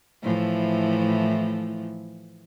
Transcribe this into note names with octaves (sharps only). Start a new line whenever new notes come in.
A2 E3 F3